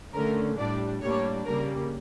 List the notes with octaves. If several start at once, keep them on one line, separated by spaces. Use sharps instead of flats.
D3 A3 C#4 A#4
A2 G3 D4 D5
A2 G3 A#3 D4 C#5
C#3 G3 A#3 A#4